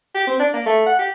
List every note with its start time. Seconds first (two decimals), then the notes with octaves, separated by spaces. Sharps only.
0.15 G4
0.27 C4
0.40 D4
0.54 A#3
0.66 A3
0.86 F#5
0.99 G4